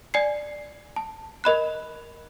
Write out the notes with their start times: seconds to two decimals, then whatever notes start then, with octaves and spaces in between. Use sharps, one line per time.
0.14 D5 G#5 G#6 C7
0.96 A5
1.44 A#4 D#5 B5 F#6